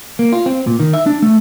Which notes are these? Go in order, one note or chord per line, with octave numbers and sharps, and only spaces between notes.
A#3
F4
C4
A#2
D#3
E5
D4
A3